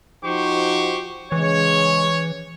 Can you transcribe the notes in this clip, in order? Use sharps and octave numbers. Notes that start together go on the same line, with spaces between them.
F3 D#4 F#4 G4 C5 C#6
C#3 E3 G#3 C#5